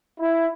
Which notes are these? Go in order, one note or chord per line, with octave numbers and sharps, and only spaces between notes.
E4